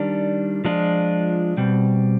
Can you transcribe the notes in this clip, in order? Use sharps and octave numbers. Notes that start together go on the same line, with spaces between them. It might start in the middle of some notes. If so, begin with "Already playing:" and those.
Already playing: D#3 G3 D4
F3 G#3 D4 F4
B2 G3 C4